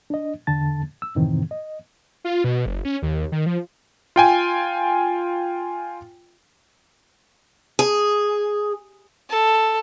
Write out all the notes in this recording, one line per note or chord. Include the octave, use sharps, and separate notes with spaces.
D4 D#5
E2 D3 A5 A6
E6
F#2 A2 C3 D#3 E3 C4
D#5
F4
B2
F#1
C#4
D#2
D#3
F3
F4 G5 G#5
G#4
A4